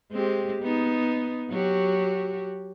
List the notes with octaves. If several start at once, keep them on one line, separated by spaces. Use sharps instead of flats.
G#3 C4 G4
B3 D#4
F#3 F#4 G4